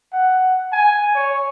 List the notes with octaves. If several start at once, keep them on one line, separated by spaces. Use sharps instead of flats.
F#5
G#5
C#5